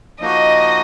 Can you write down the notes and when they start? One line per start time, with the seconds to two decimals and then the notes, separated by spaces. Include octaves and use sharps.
0.20 F3 A#3 D#4 F#4 D#5